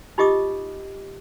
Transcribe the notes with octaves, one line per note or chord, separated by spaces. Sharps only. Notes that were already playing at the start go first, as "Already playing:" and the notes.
D#4 F4 G4 D#5 D6 D#6